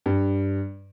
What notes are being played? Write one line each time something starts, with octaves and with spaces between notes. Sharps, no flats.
G2